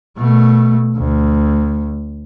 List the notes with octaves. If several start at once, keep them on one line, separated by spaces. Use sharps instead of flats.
B2 A3
D2